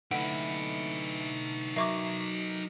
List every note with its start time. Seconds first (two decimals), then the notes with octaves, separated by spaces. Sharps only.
0.11 D3 A3 D#4 E4 B4 F#5
1.76 F#3 A#4 D#5 E5 C#6 D6